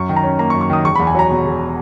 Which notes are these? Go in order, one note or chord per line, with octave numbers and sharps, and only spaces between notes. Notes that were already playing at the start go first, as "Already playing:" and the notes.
Already playing: F#2 C#6
D#3
A#5
C#4
A#3 A#5
C#6
F#2
C#6
D#3 D#6
E1 C#6
E2 B5
G#5
F#3 A#5
B2
E1